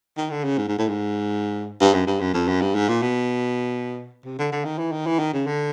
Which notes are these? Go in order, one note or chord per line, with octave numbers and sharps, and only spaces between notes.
D#3
D3
C#3
G#2
G#2
A2
G#2
G2
F#2
G2
F#2
F2
F#2
G2
G#2
A#2
B2
C3
D3
D3
D#3
E3
D#3
E3
D#3
C#3
D3